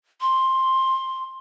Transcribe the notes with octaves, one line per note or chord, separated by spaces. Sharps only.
C6